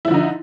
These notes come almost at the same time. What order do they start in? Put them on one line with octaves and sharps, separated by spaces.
E4 F3 D3 D#4